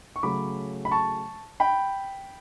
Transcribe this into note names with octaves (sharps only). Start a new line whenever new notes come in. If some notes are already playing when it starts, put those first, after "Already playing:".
C#6
C#3 F#3 A3 B5 D6
B5
A5 C#6
G5 B5